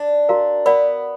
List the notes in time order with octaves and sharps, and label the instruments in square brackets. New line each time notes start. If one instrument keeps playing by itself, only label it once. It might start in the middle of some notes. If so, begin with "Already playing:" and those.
Already playing: [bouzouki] D4
[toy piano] F#4 A#4 F5 A#5
[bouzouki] B3 [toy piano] A#4 D5 F#5 B5